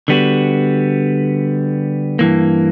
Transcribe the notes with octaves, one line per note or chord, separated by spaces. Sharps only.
D3 G3 B3 F#4
G2 E3 A#3